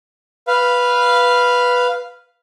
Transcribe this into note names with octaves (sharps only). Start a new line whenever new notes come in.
B4 F5